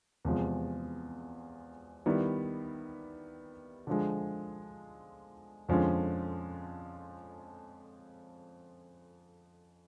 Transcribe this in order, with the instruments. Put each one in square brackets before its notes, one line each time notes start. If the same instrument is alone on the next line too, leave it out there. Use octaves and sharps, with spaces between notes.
[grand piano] E2 C3 F3 G#3
D#3 G3 B3 E4
D3 F3 G#3
F2 D3 F3 G#3 C#4